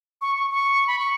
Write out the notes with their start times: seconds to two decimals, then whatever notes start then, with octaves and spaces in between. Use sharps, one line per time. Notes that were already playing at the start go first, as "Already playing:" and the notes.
0.22 C#6
0.36 C#6
0.51 C#6
0.87 B5
0.99 C#6